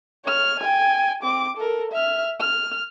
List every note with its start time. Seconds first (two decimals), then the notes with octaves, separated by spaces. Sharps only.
0.24 C#5 F6
0.59 G5 G#5
1.23 C4 D6
1.57 A4 A#4
1.91 E5 F6
2.40 F6